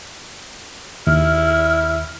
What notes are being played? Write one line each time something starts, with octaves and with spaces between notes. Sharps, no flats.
D#2 E4 F6